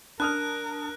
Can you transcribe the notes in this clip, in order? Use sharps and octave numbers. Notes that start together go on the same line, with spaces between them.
D4 A#4 A5 D#6 F6 F#6